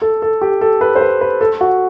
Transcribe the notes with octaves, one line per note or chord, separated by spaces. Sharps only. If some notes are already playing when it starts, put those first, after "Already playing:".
A4
A4
G4
A4
B4
C5
B4
B4
A4
F#4